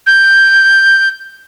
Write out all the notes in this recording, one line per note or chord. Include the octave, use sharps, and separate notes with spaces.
G6